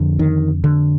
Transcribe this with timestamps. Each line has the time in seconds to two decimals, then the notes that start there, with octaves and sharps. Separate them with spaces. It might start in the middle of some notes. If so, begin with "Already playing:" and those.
Already playing: F2 D3
0.19 D#3
0.64 D3